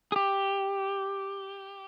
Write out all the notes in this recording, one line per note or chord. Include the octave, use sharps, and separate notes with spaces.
G#4
G4